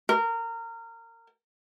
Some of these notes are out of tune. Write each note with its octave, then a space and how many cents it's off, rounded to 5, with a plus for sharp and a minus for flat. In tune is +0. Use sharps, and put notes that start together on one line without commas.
A#4 -25